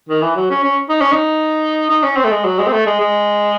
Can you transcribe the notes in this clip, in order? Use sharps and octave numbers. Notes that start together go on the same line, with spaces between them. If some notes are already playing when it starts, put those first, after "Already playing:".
D#3
E3
F#3
C#4
C#4
D#4
C#4
D#4
D#4
C#4
C4
A3
G#3
F#3
G#3
C4
A3
G#3
G#3